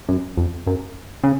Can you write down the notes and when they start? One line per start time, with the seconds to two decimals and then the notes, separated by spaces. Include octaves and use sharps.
0.09 F#2
0.37 F2
0.67 F#2
1.23 C#3